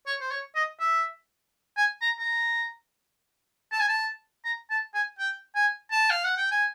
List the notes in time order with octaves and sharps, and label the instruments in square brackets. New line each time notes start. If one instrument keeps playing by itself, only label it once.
[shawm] C#5
C5
C#5
D#5
E5
G#5
A#5
A#5
A5
G#5
A5
A#5
A5
G#5
G5
G#5
A5
F5
F#5
G5
G#5